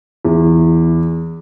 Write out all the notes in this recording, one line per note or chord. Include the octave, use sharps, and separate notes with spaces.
E2